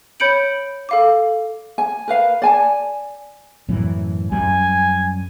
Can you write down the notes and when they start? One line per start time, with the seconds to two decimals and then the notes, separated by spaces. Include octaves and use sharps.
0.20 C#5 B5 G6 C#7 D7 F#7
0.89 A4 F5 D6
1.78 G#5
2.08 A#4 B4 F5
2.42 D5 G#5 A5
3.69 F#2 A2 E3
4.32 F#2 G3 G#5